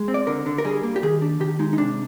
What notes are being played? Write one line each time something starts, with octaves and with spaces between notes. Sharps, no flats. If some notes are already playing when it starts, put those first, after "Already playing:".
Already playing: G#3
C4
D5
D3 A#4
D3
A#4
G3 G#4
A#3
G4
D#3 G#4
D4
D#3 G4
G#3 D#4
D#4
C3 D4